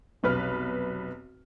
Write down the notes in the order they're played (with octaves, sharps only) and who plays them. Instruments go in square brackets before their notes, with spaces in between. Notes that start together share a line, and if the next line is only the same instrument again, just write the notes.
[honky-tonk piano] F1 B1 B4 F6